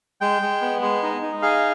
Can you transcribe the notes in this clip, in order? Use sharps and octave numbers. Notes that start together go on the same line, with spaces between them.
G#3 G5
G#3
B3
G#3
D#4
D#4
G#4 F5